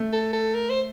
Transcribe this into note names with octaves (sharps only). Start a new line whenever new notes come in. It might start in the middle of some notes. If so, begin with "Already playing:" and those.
Already playing: A3
A4
A4
A#4
C5